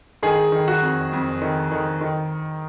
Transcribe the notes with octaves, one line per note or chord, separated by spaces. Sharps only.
D#3 G#4
D#3
F#4
F2
F2
D#3
D#3
D#3